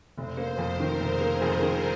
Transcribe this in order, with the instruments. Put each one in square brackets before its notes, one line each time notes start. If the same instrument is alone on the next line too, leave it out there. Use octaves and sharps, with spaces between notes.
[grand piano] F1 [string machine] C5
[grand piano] A#3
[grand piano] F2 [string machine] A#4
[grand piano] D#3
[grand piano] F1 [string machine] G#4
[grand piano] A#3
F2
D#3